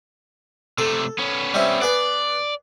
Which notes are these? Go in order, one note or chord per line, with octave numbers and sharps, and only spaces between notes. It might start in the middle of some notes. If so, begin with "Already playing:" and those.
C3 A3 A4
B3 C#4
G3 C4 E4
B3 G#4 B4 D5